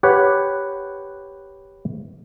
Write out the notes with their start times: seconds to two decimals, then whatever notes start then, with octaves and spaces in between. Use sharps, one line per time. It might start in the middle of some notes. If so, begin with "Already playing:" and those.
0.03 G4 B4 C#5 F#5